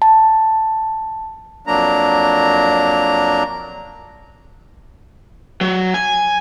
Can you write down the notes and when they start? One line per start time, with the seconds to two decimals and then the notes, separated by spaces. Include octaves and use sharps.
0.02 A5
1.67 F2 F#3 A#3 D4 A#5
5.61 F#3
5.94 G#5